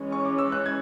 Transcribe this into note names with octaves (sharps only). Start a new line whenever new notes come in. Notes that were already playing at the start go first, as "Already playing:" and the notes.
Already playing: E3 G#3 C#4
C#6
D6
E6
F#6
G#6